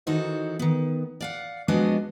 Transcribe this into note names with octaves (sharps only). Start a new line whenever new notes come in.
D#3 E3 D#4 F#4 A4 C5
D#3 B3
D5 F5 F#5
F3 G#3 B3 D4 F#4 D#5